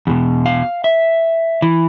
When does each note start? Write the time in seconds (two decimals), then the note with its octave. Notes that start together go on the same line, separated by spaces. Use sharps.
0.07 E2 B2
0.46 F5
0.84 E5
1.62 E3